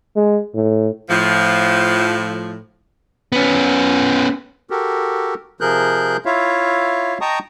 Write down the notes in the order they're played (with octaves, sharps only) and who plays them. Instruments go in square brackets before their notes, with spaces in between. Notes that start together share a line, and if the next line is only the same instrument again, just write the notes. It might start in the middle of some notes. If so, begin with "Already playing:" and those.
[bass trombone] G#3
A2
[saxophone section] A2 F3
[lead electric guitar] B3 C#4
[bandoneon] F#4 G4 A4 A#4
C3 F3 G#4 A#4 F#6 G6
E4 F4 C#5 E5 F5
D#5 G5 A5 A#5 C#6 D#6